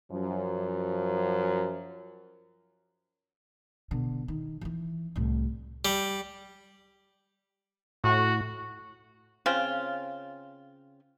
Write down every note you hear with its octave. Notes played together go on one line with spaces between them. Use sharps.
F#2 F3
B2 D3
D#3
E3 F3
C2 A2
G3
A2 F#4
C#3 C4 F4